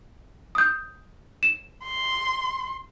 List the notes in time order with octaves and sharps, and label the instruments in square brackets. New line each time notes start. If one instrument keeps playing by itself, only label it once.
[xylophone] D#6 G6
E7
[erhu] C6